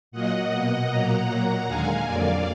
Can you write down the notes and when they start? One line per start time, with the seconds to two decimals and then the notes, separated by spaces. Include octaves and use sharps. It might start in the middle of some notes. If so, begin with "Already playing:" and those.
0.12 A#2 F#3 A#3 D#5 F#5
0.51 B2 A#3
0.89 A#2 F#3 A#3 F#5 A#5
1.28 A#2 F#3 A#3
1.66 D#2 D3 G#3 F5 G#5
2.05 F2 D3 F#3 A#3 D5 F5